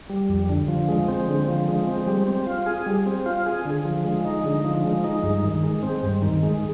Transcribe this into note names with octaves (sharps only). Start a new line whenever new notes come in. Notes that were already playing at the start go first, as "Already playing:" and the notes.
G3
F2
D3
F3
G#3
C4
D3
F3
G#3
C4
G3
C4
F4
G#4
G3
C4
F4
G#4
D3
F3
G#3
D#4
D3
F3
G#3
D#4
G2
D#3
G#3
C4
G2
D#3
G#3